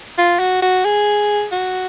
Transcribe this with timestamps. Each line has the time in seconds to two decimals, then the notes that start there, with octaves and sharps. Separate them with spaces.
0.18 F4
0.39 F#4
0.62 F#4
0.85 G#4
1.52 F#4